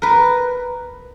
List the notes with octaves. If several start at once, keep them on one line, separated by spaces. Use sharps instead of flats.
A#4 B4